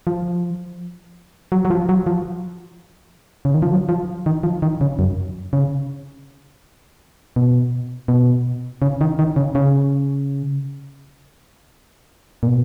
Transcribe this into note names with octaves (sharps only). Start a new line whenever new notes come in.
F3
F#3
F#3
F3
F#3
F3
C#3
D#3
F3
F#3
F3
D#3
F3
D#3
C#3
F#2
C#3
B2
B2
C#3
D#3
D#3
C#3
C#3
A#2
B2